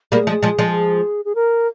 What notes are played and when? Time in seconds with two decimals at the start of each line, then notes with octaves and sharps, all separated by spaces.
0.12 G3 A#3 G#4
0.27 F3 G#3
0.42 F3 G#3
0.58 F3 G#3
1.25 G#4
1.35 A#4